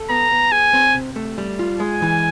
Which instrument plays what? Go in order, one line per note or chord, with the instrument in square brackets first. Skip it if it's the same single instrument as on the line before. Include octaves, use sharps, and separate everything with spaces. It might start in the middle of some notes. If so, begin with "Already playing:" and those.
Already playing: [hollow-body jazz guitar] A4
[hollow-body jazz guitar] B3 [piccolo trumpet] A#5
[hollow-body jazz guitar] B3
[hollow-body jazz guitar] G#4 [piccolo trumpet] G#5
[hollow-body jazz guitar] C4
C3
A3
G3
F4
[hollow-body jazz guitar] G#3 [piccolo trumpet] G#5
[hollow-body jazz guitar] E3